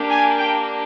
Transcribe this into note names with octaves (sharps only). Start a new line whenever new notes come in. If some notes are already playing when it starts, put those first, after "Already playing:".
Already playing: A#3 D4 G4
G#5
G5